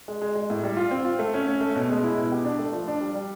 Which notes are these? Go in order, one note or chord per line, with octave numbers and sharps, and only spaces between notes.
G#3
G#3
G#3
A2
G3
F4
C4
F4
A3
C#4
C#4
A3
B2
G#3
E4
B2
G4
D4
A3
F3
D4
G3
G3